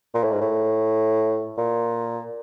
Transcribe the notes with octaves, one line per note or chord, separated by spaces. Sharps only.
A#2
A2
G#2
A2
A#2